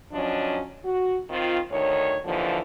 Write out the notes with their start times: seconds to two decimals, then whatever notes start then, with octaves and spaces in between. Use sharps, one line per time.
0.12 F3 F#3 C#4 D4 D#5
0.84 F#4
1.30 D#3 C4 F4
1.71 D2 D#3 C#5
2.25 D#2 D3 E3 F3